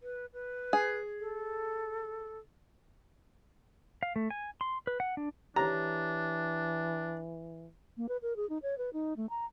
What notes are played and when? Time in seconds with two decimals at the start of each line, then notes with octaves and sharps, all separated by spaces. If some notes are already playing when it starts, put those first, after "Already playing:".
0.01 B4
0.33 B4
0.73 G#4
1.20 A4
4.03 F5
4.16 A3
4.30 G#5
4.61 C6
4.87 B4
5.00 F#5
5.17 D4
5.56 E3 D4 G4 C#5 A#5 A#6
7.97 A#3
8.09 B4
8.22 A#4
8.36 G#4
8.49 D#4
8.62 C#5
8.78 B4
8.93 D#4
9.17 A3
9.30 A#5